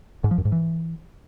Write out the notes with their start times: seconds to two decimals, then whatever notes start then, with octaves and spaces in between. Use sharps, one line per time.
0.24 G#2
0.31 F3
0.38 F#2
0.45 G#2
0.52 E3